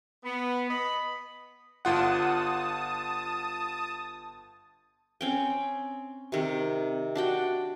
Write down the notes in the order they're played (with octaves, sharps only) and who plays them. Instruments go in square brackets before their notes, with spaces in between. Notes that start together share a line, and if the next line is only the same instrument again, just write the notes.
[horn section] B3
D#5 B5
[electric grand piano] G1 F4 F#5 [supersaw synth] A5 D#6
[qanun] C4 C#4 G5
C3 D#3
D4 F#4 G5